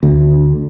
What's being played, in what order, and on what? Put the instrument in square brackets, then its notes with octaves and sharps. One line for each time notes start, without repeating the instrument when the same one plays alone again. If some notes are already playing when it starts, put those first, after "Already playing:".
[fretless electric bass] D2